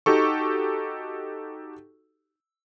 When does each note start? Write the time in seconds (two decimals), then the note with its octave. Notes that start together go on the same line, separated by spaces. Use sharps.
0.06 D#4 F#4 G4 A4 C#6